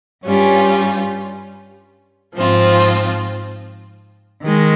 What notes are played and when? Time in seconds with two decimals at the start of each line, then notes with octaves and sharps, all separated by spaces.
0.25 G2 G3 C#4 F4
2.34 G#2 F3 C4 F4
4.44 D#3 G#3